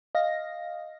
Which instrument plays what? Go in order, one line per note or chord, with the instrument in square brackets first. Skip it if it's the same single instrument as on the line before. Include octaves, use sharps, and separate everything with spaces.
[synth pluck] D#5 F5 A#6